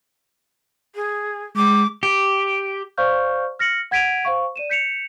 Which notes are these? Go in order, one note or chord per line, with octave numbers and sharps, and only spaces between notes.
G#4
G#3 D6
G4
C5 D5 F5 C#6 F6 G6
F6 A#6 C#7 F#7
F#5 G#6 B6 D7 D#7 F7
C5 F5 C#6
D5 D#7 E7
G6 B6 C#7 E7 F7